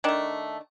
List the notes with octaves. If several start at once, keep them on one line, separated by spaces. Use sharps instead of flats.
D#3 A3 D4